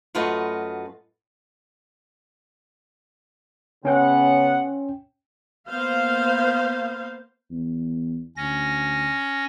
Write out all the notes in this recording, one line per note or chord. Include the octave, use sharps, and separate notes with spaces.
F#2 A3 F4 F#4 B4 D#5
C#3 B3 C#4 F#5 G5
A#3 B3 C5 F5
E2
D2 C#4 A#6